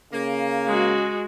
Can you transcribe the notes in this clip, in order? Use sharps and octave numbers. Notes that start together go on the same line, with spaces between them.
C#3 A#3
G#3 F#4